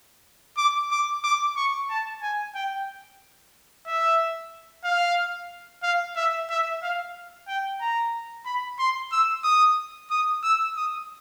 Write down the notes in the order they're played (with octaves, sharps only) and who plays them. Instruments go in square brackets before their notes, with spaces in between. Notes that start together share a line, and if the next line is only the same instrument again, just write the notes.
[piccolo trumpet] D6
D6
D6
C#6
A5
G#5
G5
E5
F5
F5
E5
E5
F5
G5
A#5
B5
C6
E6
D#6
D#6
E6
D#6